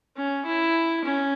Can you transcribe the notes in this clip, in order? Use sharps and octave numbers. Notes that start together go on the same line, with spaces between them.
C#4
E4
C#4